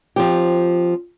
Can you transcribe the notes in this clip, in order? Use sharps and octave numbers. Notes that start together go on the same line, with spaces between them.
F3 C4 G4